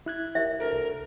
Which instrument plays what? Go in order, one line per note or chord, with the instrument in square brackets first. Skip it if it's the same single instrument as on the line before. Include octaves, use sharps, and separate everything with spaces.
[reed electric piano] E4 F#6 G#6
[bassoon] D#2 [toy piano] E5
[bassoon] D2 [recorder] A#4
[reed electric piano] C2